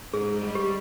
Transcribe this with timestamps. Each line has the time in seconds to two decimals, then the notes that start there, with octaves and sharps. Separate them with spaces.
0.13 G#2 G#4
0.41 G3
0.55 G4